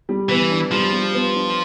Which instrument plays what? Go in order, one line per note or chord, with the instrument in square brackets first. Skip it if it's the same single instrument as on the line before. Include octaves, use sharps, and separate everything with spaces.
[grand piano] G3
[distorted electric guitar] E3 [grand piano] B3
[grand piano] D4
[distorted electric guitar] F3 [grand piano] G3
[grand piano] G3
B3
D4